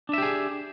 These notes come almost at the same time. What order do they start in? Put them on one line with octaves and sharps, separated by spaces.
D4 E5 G4 G#4